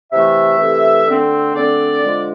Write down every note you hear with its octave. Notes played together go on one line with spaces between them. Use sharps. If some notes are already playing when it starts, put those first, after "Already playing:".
C3 E3 A3 E5
C3 E3 A3
D3 A3 C4
D3 A3 C4 D5
D3 F3 G#3